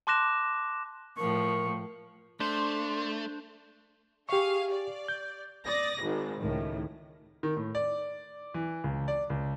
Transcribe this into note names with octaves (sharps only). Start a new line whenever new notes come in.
A5 C6 D6 F#6 A#6 E7
A2 F3 A#4 C#6
A3 D4 C5 C6
G4 G#4 F5 C#6
D5
G6
D5 D#6 A#6
G#1 D#3
C#2 A2 D#3
D#3
A2
D5
E3
C#2
D5
C#2